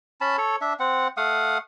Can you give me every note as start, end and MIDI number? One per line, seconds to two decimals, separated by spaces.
0.21 0.37 61
0.21 0.37 81
0.21 0.37 83
0.38 0.56 69
0.38 0.56 73
0.61 0.73 62
0.61 0.73 76
0.80 1.08 60
0.80 1.08 78
1.17 1.58 57
1.17 1.58 77
1.17 1.58 78
1.17 1.58 87